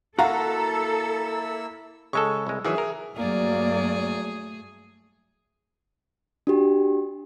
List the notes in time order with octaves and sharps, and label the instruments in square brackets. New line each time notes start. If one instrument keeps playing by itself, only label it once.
[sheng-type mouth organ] A#3 E4 E6 [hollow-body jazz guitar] F#4 F5 F#5 [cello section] A4 [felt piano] A#5
[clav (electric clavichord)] C#3 G#3 A4 [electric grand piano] C#6 E6
[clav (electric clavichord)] C2 G#3
[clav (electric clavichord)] D#3 E3 F#3 [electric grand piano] G#4 E5
[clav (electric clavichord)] A#4
[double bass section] G2 F#3 [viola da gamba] A3 G#4 [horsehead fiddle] A#3 D5
[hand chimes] D4 F#4 G4